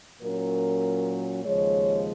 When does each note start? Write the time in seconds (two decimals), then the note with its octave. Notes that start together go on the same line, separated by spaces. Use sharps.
0.21 A#2 F#3 C#4 A#4
1.45 D#2 C#3 F3 G#3 C#5